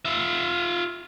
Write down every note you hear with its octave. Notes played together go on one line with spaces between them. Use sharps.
F4 E5